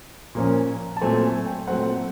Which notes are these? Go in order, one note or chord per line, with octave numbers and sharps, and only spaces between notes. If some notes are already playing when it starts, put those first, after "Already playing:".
A#2 F3 A#3 C#4
A5
A#2 F#3 A3 C4 G#5
G#5
G5
A#2 F#3 A3 C4 F#5